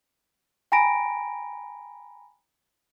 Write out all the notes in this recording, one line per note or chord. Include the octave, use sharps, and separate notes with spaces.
G5 G#5 A#5 B5 A#6 D7